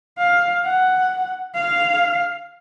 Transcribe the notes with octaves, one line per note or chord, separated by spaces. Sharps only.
F5
F#5
F5